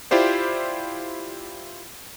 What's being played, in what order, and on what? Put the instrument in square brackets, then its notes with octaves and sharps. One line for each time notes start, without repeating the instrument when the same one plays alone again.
[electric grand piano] E4 F4 G4 C5 D5